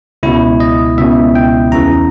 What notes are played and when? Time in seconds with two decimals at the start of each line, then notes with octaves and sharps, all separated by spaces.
0.23 C#2 B2 E4
0.60 D#5
0.97 C#2 B2 E5
1.35 G5
1.72 E2 C#3 E3 A#5